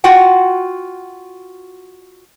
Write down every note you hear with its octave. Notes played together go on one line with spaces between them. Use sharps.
F4 F#4 F#5 G5